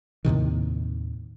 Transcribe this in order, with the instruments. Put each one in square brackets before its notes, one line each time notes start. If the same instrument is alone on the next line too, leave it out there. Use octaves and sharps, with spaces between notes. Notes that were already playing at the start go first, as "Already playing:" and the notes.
[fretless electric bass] D#2 A2 C3 D#3